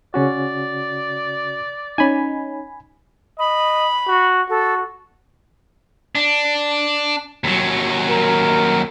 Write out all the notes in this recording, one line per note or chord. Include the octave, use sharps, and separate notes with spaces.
C#3 C#4 F#4 D5
C#4 D#4 G#5 B5
D#5 B5
F#4
F#4 A4
D4
D#2 F#3
A#4